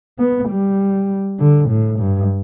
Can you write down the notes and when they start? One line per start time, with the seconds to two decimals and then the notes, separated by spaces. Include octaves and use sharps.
0.19 B3
0.49 G3
1.40 D3
1.69 A2
2.00 G2